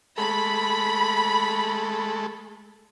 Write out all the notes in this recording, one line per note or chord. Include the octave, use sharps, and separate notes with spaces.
G#3 A3 A4 B5